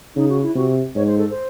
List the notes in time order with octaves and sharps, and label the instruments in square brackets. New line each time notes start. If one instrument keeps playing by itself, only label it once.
[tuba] C#3 [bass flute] D#4
[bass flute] F#4
E4
[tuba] C3 [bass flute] F#4
[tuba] G#2 [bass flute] C#5
[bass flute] C5
A4
C5